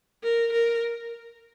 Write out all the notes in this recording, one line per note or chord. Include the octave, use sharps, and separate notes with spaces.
A#4
A#4